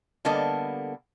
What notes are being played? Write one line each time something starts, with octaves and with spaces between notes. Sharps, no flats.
D3 G3 A#3 B3 A4 D#5